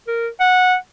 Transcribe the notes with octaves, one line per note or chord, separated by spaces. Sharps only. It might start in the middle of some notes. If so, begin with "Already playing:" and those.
A#4
F#5